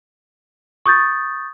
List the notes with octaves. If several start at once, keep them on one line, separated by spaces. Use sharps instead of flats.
C#6 D#6 G6 A6